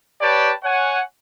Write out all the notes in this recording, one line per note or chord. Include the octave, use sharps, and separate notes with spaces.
G4 B4 C#5 D5 G5 A5
C#5 F#5 G#5